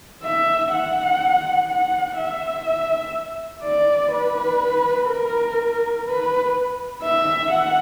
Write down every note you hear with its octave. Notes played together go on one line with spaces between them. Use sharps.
E5
F#5
F#5
E5
E5
D5
B4
A#4
B4
E5
F#5